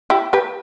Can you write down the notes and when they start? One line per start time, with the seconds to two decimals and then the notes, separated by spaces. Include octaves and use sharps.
0.10 E4 G4
0.33 G4 B4